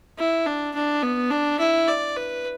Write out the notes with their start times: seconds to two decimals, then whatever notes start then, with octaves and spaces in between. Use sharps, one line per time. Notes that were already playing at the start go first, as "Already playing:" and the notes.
0.18 E4
0.46 D4
0.75 D4
1.03 B3
1.31 D4
1.59 E4
1.88 D5
2.17 B4